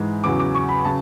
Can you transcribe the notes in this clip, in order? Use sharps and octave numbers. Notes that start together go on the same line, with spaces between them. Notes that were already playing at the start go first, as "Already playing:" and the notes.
Already playing: G#2 E3 G#3
E2 C#3 F#3 D6
D6
C#6
B5
C#3 F#3 A5